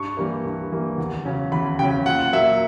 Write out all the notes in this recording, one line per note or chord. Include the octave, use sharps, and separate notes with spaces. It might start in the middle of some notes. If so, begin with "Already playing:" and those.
Already playing: G2 C#6
E3 G3 A#3
G2
E3 G3 A#3
E2
C#3 F#3 C#4
E2 B5
C#3 F#3 C#4 G5
A#2 F#5
F#3 A#3 E5